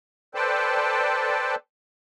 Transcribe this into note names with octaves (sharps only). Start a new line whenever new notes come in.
A4 B4 C5 D5 G5 A5